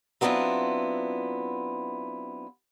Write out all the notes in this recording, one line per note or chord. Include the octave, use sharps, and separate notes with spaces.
F#3 B3 C4 D4 E4 F4